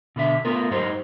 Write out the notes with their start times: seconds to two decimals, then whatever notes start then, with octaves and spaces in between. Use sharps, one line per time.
0.16 B2 D3 E5
0.45 A3 B3 F4 A#4
0.71 G#2 F#3 D#4 G4 C5